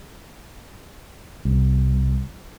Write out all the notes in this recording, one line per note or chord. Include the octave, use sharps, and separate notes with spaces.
C2